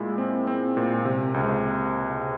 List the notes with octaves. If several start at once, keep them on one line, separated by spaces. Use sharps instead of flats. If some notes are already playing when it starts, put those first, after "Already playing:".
Already playing: A#2 G#3 E4
C4
C4
A#2
C3
C#2